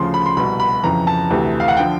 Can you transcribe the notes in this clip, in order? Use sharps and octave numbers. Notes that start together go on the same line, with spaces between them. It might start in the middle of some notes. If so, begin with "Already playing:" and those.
Already playing: D2 C#3 F3 C6
B5
C6
C2 B2 B5
B5
F2 C#3 E3 A#5
A5
D2 C3 E3
F5
F#5
D3 F3 G5